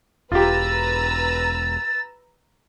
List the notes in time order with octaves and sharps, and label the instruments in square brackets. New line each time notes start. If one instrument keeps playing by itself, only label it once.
[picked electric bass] E1 [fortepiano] F4 G4 [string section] B4 A#5 E6 [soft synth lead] A6